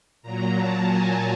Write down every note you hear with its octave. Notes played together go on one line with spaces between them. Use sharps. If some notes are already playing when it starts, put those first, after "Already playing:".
A#2 F#3 A#5
A5
G#5